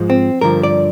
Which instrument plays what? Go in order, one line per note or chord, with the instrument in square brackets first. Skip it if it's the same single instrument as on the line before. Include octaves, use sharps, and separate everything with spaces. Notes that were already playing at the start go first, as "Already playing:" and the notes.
Already playing: [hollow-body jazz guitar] G#2 F3 G#3
C4
G2 D3 F3 A#4
D5